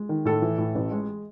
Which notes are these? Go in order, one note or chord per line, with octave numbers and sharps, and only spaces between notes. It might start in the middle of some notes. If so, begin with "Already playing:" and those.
Already playing: G#3
D#3
A2 A4
E3
A2
A1
G#3